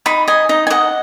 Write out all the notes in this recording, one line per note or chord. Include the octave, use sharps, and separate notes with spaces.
D#4 B5
D#5 G#5
D#4 D#5
G#5
D#5 F#5